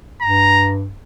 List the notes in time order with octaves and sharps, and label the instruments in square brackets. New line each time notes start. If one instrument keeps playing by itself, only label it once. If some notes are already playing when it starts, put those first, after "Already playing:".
[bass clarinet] G2 [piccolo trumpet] A#5